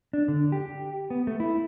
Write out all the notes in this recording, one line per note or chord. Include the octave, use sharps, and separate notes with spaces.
D4
D3
G4
B3
A3
E4